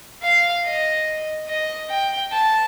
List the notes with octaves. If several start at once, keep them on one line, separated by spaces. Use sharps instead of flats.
F5
D#5
D#5
G5
A5